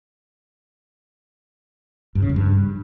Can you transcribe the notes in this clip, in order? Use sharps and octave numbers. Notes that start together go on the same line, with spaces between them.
G2
C#3
F#2
G2